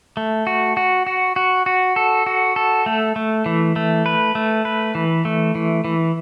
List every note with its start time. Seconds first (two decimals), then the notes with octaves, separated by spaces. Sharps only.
0.17 A3
0.47 F#4
0.77 F#4
1.07 F#4
1.36 F#4
1.66 F#4
1.96 A4
2.26 F#4
2.56 A4
2.86 A3
3.16 A3
3.46 E3
3.76 A3
4.06 B4
4.35 A3
4.65 B4
4.95 E3
5.25 A3
5.55 E3
5.85 E3